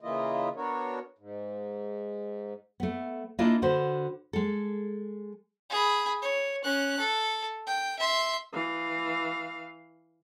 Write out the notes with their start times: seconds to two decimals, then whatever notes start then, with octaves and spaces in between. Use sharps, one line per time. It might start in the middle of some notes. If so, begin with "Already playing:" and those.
0.01 C#3 E3 A#3 E4 F4 D#5
0.56 B3 D4 F#4 A#4 C#5
1.18 G#2
2.80 A3 B3
3.39 A#3 D4 E4 F4 A#4 D#5
3.62 D3 F#4 B4 C5
4.33 G#3 A4
5.70 G#4 B5
6.22 C#5
6.64 C#4 F#6
6.99 A4
7.67 G5
7.99 E5 C6
8.53 E3 F5